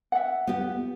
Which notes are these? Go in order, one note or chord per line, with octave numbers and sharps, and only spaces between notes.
E5 F#5
B3 G4